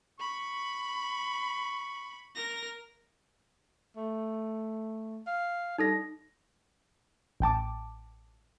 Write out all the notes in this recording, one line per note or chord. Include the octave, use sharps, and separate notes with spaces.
B5 C#6
A#4 A#6
A3
F5
G3 D#4 A4 A#6
A1 G5 A5 D6